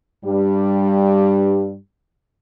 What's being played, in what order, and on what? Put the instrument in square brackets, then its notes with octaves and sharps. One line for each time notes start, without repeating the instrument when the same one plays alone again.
[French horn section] G2 G3